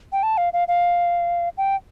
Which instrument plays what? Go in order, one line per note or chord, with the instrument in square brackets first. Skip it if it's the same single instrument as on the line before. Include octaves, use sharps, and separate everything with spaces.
[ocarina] G5
A5
F5
F5
F5
G5